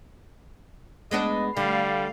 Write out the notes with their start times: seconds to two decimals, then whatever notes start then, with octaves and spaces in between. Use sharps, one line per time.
1.11 G#3 B3 D4 D#5
1.57 D3 G3 A3 F5